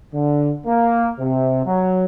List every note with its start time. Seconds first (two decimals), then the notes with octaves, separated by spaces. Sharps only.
0.13 D3
0.66 A#3
1.19 C3
1.66 F#3